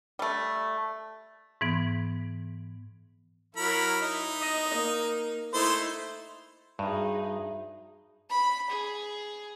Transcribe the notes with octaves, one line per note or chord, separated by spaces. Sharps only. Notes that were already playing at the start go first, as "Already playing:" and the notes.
G3 A3
G#2 E3 B3
F#3 E4 A#4 B5
D#4
D#5
A#3
A3 D#4 E4 C5
G2 D#4 F#4 G#4 E5
B5
G#4